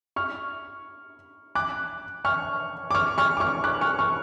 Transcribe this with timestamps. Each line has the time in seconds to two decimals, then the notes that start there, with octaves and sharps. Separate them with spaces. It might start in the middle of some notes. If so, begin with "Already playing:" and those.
0.16 C#6 F6
1.55 D6 F#6
2.25 C#6 F6
2.91 D6
2.95 C#6 F6
3.18 C#6 F6
3.37 D6
3.40 C#6 F6
3.64 D6 F#6
3.81 C#6 F6
3.99 C#6 F6